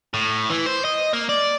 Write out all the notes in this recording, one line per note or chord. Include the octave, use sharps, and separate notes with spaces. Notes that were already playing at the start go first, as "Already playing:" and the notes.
A2
E3
C5
D#5
A#3
D5